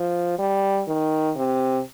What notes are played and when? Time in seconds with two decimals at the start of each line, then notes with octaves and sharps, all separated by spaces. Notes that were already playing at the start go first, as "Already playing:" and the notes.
Already playing: F3
0.38 G3
0.88 D#3
1.37 C3